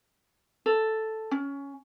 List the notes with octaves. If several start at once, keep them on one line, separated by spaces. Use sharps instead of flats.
A4
C#4